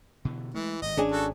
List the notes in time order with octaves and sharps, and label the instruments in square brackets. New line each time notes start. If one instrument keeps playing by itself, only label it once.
[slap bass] B2 D3 E3
[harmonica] E3 [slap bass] G#3 A3
[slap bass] G#1 G2 [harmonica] D#5
[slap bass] G#1 [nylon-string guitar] C#4 D4 G#4
[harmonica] F#4 A4